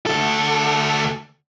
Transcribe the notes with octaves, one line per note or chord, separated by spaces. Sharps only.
D2 A4